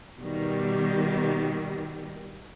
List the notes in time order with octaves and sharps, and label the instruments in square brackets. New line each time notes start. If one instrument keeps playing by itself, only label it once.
[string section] B2 D#3 G3